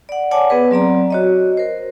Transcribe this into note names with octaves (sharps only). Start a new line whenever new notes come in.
D5 F#5
C#5 D5 F#5 G#5 A5 D6
B3 G#4 B4
F#3 C4 D5 A#5
F#4 C#5 D#5
A#4 C5